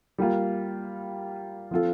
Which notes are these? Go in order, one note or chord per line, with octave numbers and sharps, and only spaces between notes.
G3 A#3 F4
F3 C4 F4 A4